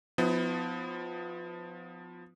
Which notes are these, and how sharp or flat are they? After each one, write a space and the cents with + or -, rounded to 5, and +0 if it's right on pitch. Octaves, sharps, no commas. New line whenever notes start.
F3 +20 B3 +30 E4 -30